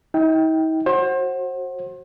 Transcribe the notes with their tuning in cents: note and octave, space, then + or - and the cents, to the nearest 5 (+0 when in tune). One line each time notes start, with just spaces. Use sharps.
D#4 +45 G5 -5
F#4 +0 C5 +30